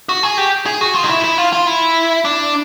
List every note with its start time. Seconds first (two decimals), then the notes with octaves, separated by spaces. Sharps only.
0.09 F#4
0.23 G#4
0.38 G4
0.66 G#4
0.81 F#4
0.95 F4
1.03 D#4
1.10 E4
1.24 E4
1.38 F4
1.53 F4
1.67 E4
2.25 D4